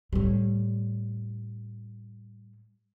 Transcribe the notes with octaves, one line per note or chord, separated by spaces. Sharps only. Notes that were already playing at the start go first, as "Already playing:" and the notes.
A2 G3